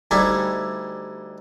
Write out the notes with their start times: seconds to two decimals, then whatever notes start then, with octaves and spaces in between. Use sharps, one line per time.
0.11 D2 G3 D#4 E4 G#5